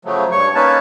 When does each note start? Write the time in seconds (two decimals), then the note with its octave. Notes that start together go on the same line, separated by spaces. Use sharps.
0.05 C#3 F3 F#3 A3
0.32 G2 C#5 C#6
0.55 A#3 C#4 D#4 B4 C#5 A5